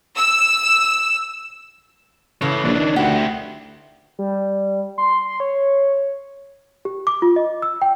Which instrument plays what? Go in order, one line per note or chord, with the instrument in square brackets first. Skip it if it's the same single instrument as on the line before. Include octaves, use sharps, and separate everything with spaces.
[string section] E6
[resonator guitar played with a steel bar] C#3 E3 [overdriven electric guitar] A4 C#5
[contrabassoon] A#1 [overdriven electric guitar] C#4 D4
[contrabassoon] D#3
[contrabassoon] D2 [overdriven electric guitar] E4 G4 [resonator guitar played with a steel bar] F#5
[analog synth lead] G3
C6
C6
C#5
[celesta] G4
D6
F4
D#5
E6
G5